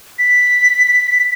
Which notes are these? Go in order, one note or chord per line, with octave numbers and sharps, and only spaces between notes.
B6